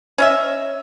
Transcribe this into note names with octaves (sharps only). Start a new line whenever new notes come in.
C#4 D#5 E5